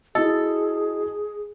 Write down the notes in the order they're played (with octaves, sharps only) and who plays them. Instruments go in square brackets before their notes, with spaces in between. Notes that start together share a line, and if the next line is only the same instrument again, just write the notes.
[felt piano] E4 F#4 [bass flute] G#4 [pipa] A4 [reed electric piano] D#5